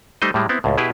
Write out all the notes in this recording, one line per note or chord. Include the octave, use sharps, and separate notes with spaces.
G3 A3 D#4 C5 D#5
A2 G3 G#3
B3 C4 E4
C#2 A2
B2 E4 G4 G#4 B4